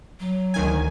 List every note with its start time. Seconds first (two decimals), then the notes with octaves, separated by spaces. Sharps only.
0.20 F#3
0.54 D2 D#3 G#5